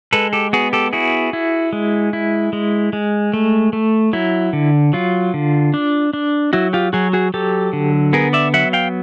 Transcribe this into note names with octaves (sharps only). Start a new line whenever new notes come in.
G#3 A4 B4
G4 A4
B3 F#4 G#4
G4 A4
E4 F#4 G#4
E4
G#3
E4
G#3
G#3
A3
A3
F#3 E4
D3
F#3 F4
D3
D4
D4
F#3 E4 F#4
F4 G4
F#3 F#4 G#4
F#4 G#4
F#3 G4 A4
D3
B3 G#4 A#4
D5 E5
F#3 E5 F#5
F5 G5